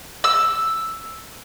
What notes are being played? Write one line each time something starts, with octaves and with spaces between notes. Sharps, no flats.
E6